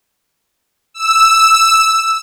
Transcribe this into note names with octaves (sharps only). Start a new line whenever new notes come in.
E6